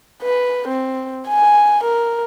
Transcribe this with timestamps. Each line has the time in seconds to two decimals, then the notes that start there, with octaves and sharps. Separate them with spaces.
0.23 B4
0.68 C4
1.28 G#5
1.84 A#4